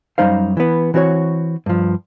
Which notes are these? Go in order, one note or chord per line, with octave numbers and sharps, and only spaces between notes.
F#2 E3 G3 D#4 C5 F5
E3 B3
E3 C4 F#4 A4 C#5
G2 F3